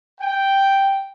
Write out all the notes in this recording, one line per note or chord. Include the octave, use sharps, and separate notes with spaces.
G5